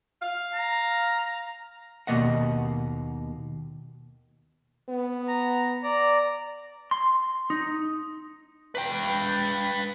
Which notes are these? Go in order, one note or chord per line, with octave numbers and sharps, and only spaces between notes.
F5
A#5
D#2 B2 A#3 D#5 F#5
B3
A#5
D5 A#5
C6
D#4
B4 G5